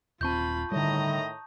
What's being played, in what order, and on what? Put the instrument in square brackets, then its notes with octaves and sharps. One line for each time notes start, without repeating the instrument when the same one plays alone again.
[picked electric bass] D#1 C4 [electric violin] F4 B5 [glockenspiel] A5 C#6 G6
[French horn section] A2 D#3 [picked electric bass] D3 G3 [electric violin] D#5 A#5